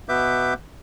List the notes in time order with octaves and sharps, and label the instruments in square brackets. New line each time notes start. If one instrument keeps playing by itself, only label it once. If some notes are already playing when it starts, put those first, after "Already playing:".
[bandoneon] B2 B3 B4 E5 D6 G6